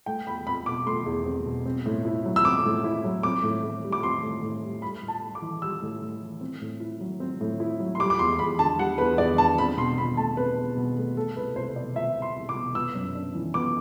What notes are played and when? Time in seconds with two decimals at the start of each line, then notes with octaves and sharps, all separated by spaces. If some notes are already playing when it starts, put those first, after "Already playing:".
0.06 A3 G5
0.27 E2 B5
0.46 C4 B5
0.66 B2 D6
0.86 A3 C6
1.06 E2
1.25 C4
1.46 B2
1.66 C4
1.86 A2
2.05 E4
2.25 F#3
2.36 E6
2.45 C4 D6
2.65 A2
2.84 E4
3.04 F#3
3.23 C4 D6
3.43 A2
3.63 A2
3.84 G3
3.92 D6
4.03 C4 C6
4.23 A2
4.43 A2
4.63 G3
4.82 G3 B5
5.03 A2
5.08 A5
5.22 A2
5.35 D6
5.42 E3
5.62 G3 E6
5.82 A2
6.02 A2
6.21 E3
6.41 C4
6.61 A2
6.80 E4
7.01 F#3
7.20 C4
7.41 A2
7.60 E4
7.80 F#3
7.95 C6
7.99 G3 D6
8.10 D6
8.19 E2 C6
8.39 E2 B5
8.59 D3 A5
8.78 G3 F#5
8.98 E2 B4
9.18 E2 D5
9.38 D3 A5
9.58 C4 B5
9.77 B2 C6
9.97 B2 B5
10.17 A3 A5
10.37 C4 B4
10.57 B2
10.76 B2
10.97 A3
11.16 A3 A4
11.36 C2 B4
11.56 C2 C5
11.75 B2 D5
11.95 A3 E5
12.16 C2
12.22 C6
12.36 C2
12.49 D6
12.55 B2
12.75 B3 E6
12.95 F#2
13.15 D4
13.35 E3
13.54 B3 D6